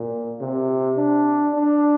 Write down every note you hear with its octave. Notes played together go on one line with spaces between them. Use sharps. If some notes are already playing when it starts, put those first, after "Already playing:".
Already playing: A#2
C3
D4
D4